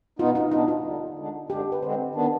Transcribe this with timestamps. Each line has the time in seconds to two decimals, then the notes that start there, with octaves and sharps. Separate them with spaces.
0.19 B2 B3 D#4 F4
0.35 D#4
0.51 B2 B3 D4 D#4
0.68 F4
0.84 D#2 D3 G3
1.17 D3 G#3 D4
1.50 G2 D3 G#3 D4 G4
1.72 B4
1.82 D3 G#3 C4 C5
2.15 D#3 B3 D4